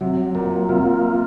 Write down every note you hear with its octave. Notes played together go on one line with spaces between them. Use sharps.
C3 F#3
A#2 A#3
C3 F4